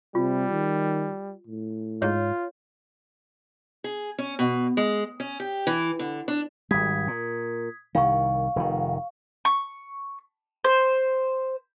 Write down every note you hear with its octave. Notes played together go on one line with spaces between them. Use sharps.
C3 G3 F4
D#3
A2
G#2 F4 C#5
G#4
C#4
B2
G#3
C#4
G4
E3
D3
D4
G#1 G3 D#6 G#6 B6
A#2
C2 D#3 F5 C#6
F1 A#2 D#3
C#6
C5